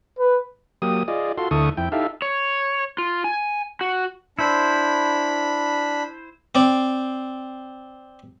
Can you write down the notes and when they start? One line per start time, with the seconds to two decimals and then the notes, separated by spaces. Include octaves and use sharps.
0.19 B4
0.82 F#3 A#3 G4 D#6
1.08 F4 G#4 D5 D#5
1.38 F4 F#4 A4 C6
1.51 D2 D3 E4 A4 C#6 D#6
1.77 F2 E4 G5
1.92 D#4 E4 G4 A4 E5 F5
2.22 C#5
2.98 F4
3.24 G#5
3.81 F#4
4.39 D4 E4 C5 B5
6.55 C4 D5